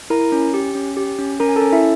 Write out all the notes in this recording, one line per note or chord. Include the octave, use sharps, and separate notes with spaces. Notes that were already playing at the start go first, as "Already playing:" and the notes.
E4 A#4 A#5
C#4
G4
C#4
G4
C#4
C#4 A#4 A#5
G#5
A4 A5
C#4
E4 E5